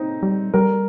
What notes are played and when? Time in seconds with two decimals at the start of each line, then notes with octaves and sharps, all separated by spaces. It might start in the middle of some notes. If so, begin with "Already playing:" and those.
Already playing: C4 D#4
0.23 G3
0.54 G3 A#4